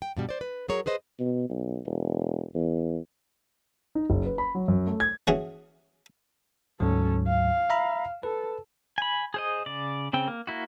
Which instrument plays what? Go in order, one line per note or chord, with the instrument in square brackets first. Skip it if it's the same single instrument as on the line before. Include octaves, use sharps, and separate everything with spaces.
[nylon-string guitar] G5
G2 B2 G3
C5 D5
B4
F#3 G#4 A#4 C#5
G#4 B4 C5 D#5
[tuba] B2
B1
E1
E2
[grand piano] D#4
F#1
B4
B5
F#3
F#2
A3
G#6
[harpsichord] E3 C#4 F#4 G#4
[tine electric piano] D2 G#2 F#3 [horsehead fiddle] C#4 A4
[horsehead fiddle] F5
[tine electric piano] E5 A#5 B5
[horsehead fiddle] A4 [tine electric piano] B4
[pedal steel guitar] G#5 B5
G#4 C5 D#5
C#3 D5
C#3 C4 G5
A#3
A#3 E4 F#4